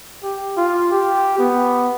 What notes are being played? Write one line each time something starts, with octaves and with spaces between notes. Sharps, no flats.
G4
F4
G4
B3